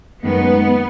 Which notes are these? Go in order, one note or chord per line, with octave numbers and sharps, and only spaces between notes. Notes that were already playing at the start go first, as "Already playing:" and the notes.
F#2 D#3 G#3 B3